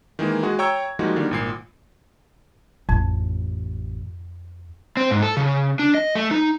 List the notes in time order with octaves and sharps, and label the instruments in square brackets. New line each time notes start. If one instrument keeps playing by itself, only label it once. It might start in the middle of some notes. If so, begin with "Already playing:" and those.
[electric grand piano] D#3 E3 G#3 A#3
G#3 F#4 G#4
C#5 G5 A#5 C#6 E6 G#6
F3 G3 G#3 A#3 D#4 F#4
D3 D#3 G3 A#3
G#1 A#2 C7
[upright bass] A1 [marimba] F2
[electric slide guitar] C4
G#2
A4
C#3
D4
D#5
A3
D#4